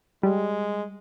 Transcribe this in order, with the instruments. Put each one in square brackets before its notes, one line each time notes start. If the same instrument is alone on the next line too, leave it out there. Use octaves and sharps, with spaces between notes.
[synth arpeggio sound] G3 [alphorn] G#3